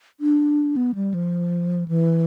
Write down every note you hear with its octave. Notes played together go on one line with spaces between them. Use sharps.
D4
B3
G3
F3
E3